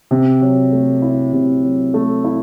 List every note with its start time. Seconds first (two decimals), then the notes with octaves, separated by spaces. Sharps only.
0.11 C3
0.41 F#3
0.72 A3
1.02 E4
1.33 C3
1.64 F#3
1.94 A3
2.24 E4